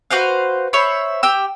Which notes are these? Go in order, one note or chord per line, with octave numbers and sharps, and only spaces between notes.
F#4 B4 C5 F5
C5 C#5 E5 B5
G4 G5 E6